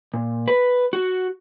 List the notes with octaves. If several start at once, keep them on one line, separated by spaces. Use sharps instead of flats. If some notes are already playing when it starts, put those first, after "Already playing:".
A#2
B4
F#4